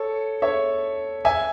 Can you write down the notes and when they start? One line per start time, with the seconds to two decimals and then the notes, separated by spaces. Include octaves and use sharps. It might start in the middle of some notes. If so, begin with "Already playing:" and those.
Already playing: A4 C#5
0.42 C#5 E5
1.25 E5 G#5